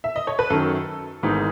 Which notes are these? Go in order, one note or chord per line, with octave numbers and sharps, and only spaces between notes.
E5
D#5
C#5
B4
F#2 D#3 F#3 A4
G#1 G#2 E3 B3 D#4